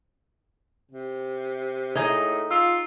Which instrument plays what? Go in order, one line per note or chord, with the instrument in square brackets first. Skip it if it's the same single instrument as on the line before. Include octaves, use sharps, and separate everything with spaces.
[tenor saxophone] C3
[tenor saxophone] A2 [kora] D#4 G#4 D#5
[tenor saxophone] F4 [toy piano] E6